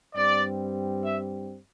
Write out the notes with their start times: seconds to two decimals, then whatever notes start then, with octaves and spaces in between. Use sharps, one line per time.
0.15 G2 G3 C4 D5
1.04 E5